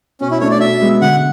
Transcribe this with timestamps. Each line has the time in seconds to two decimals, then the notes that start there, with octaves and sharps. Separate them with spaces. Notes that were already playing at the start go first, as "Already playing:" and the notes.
0.21 B2 C#4
0.31 E4
0.41 A3 D4 C#5
0.51 D5
0.60 B2 E5
0.82 G#3 B3
1.02 D3 F#5